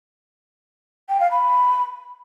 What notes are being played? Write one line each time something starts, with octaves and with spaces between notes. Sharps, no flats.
G5
F5
B5